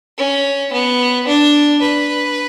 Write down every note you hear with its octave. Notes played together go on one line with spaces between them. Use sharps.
C#4
B3
D4
B4